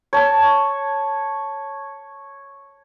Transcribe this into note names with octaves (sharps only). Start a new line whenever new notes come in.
C#5 A5